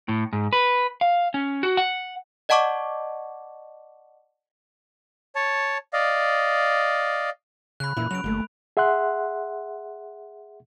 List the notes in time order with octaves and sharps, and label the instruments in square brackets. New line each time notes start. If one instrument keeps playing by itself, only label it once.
[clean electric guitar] A2
G#2
B4
F5
C#4
F#4
F#5
[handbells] D5 D#5 F#5 A5 C#6 D6
[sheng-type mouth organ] C#5 A5
D5 D#5 F5
[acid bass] C#3 [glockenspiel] B5 F#6
[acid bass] A#2 [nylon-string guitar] E3 A#3 E4 [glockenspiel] B5
[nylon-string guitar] C#3 [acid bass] F#3 [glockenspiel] D7 F7
[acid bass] G1 [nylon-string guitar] A3 A#3
[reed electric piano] G#4 E5 F#5 C6 F#6